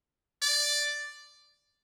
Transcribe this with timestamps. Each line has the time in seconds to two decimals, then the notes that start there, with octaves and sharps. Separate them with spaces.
0.42 D5